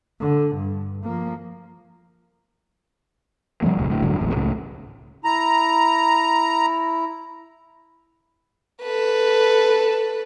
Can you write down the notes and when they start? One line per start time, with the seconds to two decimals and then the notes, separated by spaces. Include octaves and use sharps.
0.20 D3
0.57 G2
1.04 F3 A#3
3.62 C3 F3 G3 A#3
3.77 E1 C#2 A#2
3.90 D2 A2
4.02 F1 G#2 D3 F#3
4.19 E1 A1 E2 G#2
4.35 C#2 A2 C#3
5.25 E4 A#5
8.81 A4 B4